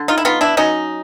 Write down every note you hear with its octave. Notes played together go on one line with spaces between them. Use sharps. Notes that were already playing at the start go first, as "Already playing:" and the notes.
Already playing: D3
D#4 F4
E4
B3 D#4 F4
D4 E4
F#3 C#4 D#4